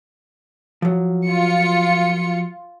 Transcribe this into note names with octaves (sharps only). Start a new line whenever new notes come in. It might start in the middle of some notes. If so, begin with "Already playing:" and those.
F3 F#3
F4 C#7